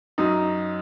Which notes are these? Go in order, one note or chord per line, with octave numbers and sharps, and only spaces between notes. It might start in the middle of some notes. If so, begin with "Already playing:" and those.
F#2 F#3 D#4